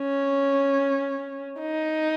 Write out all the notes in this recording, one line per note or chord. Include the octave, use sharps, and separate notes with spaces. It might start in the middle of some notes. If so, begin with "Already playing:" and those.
Already playing: C#4
D#4